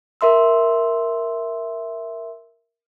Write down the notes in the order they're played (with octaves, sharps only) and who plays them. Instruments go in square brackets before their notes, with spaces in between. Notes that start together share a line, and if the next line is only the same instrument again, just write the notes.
[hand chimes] A#4 E5 C6 E6